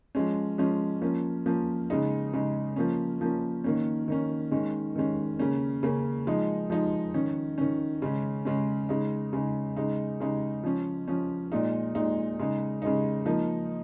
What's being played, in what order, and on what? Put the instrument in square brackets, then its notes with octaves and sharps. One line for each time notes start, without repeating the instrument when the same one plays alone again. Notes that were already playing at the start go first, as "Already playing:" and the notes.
[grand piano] F3 G#3 C#4
F3 G#3 C#4
F3 A#3 C#4
F3 A#3 C#4
C#3 G#3 D#4
C#3 G#3 D#4
F3 A#3 C#4
F3 A#3 C#4
D#3 A#3 C#4
D#3 A#3 C#4
D#3 G#3 C#4
D#3 G#3 C#4
C#3 A#3 C#4
C#3 A#3 C#4
F3 G#3 D#4
F3 G#3 D#4
D#3 C#4
D#3 C#4
C#3 G#3 C#4
C#3 G#3 C#4
C#3 G#3 D#4
C#3 G#3 D#4
C#3 G#3 D#4
C#3 G#3 D#4
F3 C#4
F3 C#4
A#2 G#3 D#4
A#2 G#3 D#4
C#3 G#3 D#4
C#3 G#3 D#4
F3 A#3 D#4